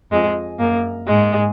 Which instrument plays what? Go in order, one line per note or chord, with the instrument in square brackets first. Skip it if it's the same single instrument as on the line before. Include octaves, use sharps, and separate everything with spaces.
[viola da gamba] F2 [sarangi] G#3
[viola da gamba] F#2 [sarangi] A#3
[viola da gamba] G#2 [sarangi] G#3